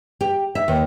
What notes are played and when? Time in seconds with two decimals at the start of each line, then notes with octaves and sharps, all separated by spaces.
0.21 G4
0.55 E5
0.68 D#2